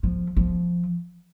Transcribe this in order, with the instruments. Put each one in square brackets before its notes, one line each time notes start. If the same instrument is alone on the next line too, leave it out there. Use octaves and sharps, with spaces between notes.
[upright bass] F3
F3